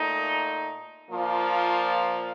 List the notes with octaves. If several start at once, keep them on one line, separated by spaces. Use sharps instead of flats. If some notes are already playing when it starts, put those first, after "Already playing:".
Already playing: A#2 A3 D#4
A#2 F3 A#3 F4